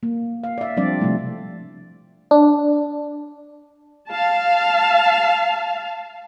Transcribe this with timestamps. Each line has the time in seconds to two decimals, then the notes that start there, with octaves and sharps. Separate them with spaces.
0.03 A#3
0.44 F5
0.58 D5 E5
0.77 F3 G3 C4 D4 D5
1.00 C3 F3 G3 A3 E4
2.31 D4
4.09 F5 A5